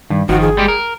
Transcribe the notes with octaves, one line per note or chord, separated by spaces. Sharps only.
G2 D#3
G1 D#3 F3 F#4
G#4
G3 G#3 G4
A#4